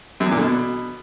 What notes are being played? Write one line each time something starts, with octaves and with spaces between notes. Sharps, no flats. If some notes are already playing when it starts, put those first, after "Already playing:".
F#2
E2
A#2
D3
B2